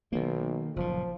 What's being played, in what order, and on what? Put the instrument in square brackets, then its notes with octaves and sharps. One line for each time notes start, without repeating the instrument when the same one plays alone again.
[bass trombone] B1 [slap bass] D#3 A#3
[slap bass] F#1 A#2 [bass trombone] F3